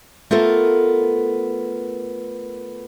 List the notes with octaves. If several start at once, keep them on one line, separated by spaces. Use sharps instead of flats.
A3 B3 F4 A4 A#4